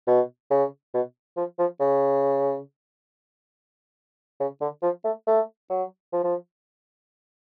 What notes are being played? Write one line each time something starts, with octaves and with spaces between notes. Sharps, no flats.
B2
C#3
B2
F3
F3
C#3
C#3
D3
F3
A3
A3
F#3
F3
F3